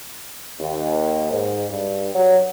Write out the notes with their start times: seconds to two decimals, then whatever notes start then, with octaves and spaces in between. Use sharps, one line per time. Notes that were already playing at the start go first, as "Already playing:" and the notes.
0.60 D#2
1.30 G#2
1.70 G2
2.15 F#3